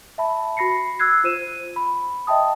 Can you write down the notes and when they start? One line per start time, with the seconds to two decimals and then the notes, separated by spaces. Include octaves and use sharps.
0.18 E5 A5 B5
0.57 F#4 B5 A#6 C7 C#7
0.99 E6 F#6 G#6 C7
1.24 F4 C5 D#7 E7
1.76 B5
2.27 D#5 E5 G5 A5 D#6